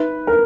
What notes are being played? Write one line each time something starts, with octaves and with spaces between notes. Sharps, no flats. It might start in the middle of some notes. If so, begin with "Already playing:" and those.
Already playing: D#4 B4 E5
A#4